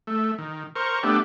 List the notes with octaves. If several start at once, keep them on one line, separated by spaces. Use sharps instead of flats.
A3
D#3
A#4 C5 C#6
A3 B3 D4 G4